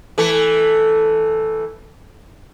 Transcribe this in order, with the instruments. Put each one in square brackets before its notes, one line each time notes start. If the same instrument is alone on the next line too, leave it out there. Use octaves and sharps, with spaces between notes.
[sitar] E3 A3 A4